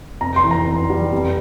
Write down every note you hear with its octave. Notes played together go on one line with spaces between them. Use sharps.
F1 A#5
C6
E3
A#5
F1
G3
F1